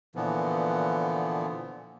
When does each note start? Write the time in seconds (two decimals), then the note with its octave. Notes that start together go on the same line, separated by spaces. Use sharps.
0.15 A#2 D3 E3 F3 B3